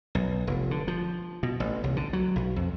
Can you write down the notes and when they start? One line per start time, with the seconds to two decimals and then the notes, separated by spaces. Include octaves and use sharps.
0.15 B1
0.47 F1
0.71 D3
0.88 F3
1.43 B2
1.60 A1
1.84 C2
1.97 D3
2.13 F#3
2.36 B1
2.56 F2